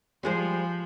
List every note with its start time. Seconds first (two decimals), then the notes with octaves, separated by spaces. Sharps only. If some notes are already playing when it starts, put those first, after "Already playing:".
0.23 F3 G3 G#3 C5